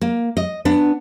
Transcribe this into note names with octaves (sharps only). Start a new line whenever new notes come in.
A#3
D#5
B3 D4